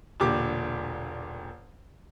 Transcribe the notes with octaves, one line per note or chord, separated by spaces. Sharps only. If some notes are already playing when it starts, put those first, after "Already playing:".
E1 A#2 D3 G4 D6